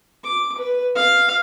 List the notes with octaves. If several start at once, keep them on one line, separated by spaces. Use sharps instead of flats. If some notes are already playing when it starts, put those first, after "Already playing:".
D6
B4
F5